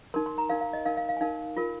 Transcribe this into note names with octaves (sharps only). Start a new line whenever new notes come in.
D#4 A#4 C6
C6
A#5
D#4 A#4 F5
F5
D#5
D#4 A#4 F5
F5
F5
G#5
D#4 A#4 F5
F4 A#4